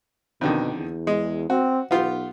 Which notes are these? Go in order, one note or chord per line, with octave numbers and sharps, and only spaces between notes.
F2 B2 D3 D#3
E2
G#3
C4 F#4
B1 B3 F4 G4